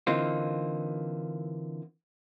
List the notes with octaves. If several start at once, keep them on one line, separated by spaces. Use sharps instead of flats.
D3 E3 A#3 C4 D#4 F4